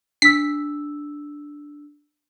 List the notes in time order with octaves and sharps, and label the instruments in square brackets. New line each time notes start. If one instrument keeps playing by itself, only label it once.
[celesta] D4 E6 [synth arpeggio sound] B6